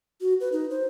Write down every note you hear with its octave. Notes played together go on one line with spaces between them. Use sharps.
F#4
B4
D#4
C5